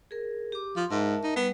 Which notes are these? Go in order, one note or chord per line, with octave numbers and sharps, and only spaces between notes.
G#4 A#4
G4 D6
F3 C6
G#2 A#4 E5 A5
D#4
G3 B3